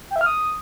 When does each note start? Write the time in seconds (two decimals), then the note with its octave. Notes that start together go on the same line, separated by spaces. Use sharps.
0.11 G5
0.16 E5
0.21 F6
0.26 D#6